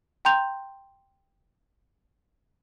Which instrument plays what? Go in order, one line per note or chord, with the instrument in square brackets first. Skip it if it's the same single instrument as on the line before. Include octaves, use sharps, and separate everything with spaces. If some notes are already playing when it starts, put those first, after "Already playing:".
[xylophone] G5 A#5 C6 G6 F7